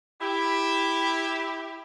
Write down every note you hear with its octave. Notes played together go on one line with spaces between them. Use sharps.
E4 G4